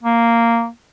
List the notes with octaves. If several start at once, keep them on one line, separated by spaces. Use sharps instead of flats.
A#3